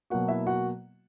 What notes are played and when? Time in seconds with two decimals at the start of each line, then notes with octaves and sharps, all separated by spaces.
0.10 B2 F#3 A#3 F#4 F#5
0.28 E4 E5
0.47 F#4 F#5